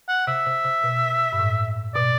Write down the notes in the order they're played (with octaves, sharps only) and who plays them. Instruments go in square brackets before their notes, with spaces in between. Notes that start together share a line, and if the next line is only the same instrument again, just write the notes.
[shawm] F#5
[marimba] C3 [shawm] E5
[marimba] C3
C3
B2
G2
A2
[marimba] B2 [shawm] D5